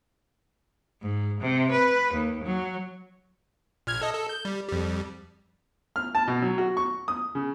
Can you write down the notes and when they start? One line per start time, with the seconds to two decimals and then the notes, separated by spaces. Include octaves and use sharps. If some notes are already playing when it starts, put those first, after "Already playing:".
1.02 G#2
1.41 C3
1.71 B4
2.14 D#2
2.43 F#3
3.87 A#1 F6 G#6
4.01 A4 D#5
4.14 A4
4.29 G6
4.45 G3
4.69 F2 G3
5.96 F6
6.15 A5
6.28 B2
6.42 F#3
6.58 F#4
6.77 C#6
7.08 D#6
7.35 C#3